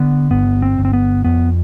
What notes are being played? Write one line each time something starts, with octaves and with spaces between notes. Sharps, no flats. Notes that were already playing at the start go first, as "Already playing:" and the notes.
Already playing: D3 B3
G1 B3
C4
G1
C4
B3
F2 B3